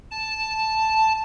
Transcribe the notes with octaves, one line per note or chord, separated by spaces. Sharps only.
A5